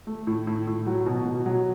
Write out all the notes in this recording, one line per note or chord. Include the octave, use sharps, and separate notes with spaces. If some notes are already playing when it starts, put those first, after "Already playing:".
A3
A2
A2
A2
F#3
B2
B2
F#3